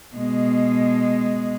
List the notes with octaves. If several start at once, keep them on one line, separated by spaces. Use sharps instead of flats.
B2 G#3